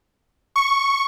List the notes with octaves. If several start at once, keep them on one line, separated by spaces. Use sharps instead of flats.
C#6